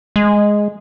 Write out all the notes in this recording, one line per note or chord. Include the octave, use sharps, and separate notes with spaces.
G#3